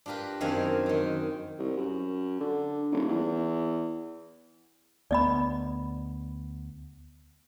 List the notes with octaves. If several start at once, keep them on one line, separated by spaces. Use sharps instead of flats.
D4 F4 G4 A#4 B4
F#2 D#3 C4 D4 F5 G#5
D#3 F#3
C2
F#2
D3
D#1
E2
D2 B3 D5 D#5 B5